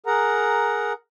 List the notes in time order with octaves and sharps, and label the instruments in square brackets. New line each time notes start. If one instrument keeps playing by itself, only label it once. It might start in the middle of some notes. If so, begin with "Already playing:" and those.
[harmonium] G#4 A#4 F#5 A#5